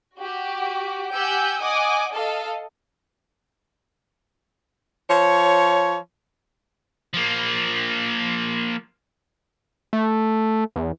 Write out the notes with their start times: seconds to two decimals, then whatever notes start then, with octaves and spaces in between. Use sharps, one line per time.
0.18 F#4 G4
1.14 G4 F#5 G#5 E6 G6
1.61 D#5 F#5 G#5 D6 D#6
2.14 A4 D#5 F5
5.10 F3 C#5
7.14 F3 A#3
9.93 A3
10.76 E2